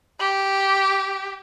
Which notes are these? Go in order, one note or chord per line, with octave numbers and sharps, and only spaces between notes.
G4